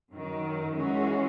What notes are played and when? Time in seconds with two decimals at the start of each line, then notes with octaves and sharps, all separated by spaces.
0.11 F#2 D#3 F#3
0.75 E3 G#3 C#4 F#4